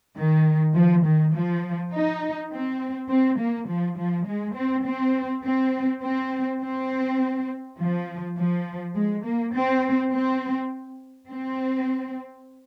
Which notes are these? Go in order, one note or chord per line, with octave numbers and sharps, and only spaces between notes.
D#3
F3
D#3
F3
D#4
C4
C4
A#3
F3
F3
G#3
C4
C4
C4
C4
C4
F3
F3
G#3
A#3
C4
C4
C4